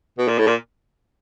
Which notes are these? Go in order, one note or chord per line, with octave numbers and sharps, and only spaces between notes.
B2
A#2
A2
A#2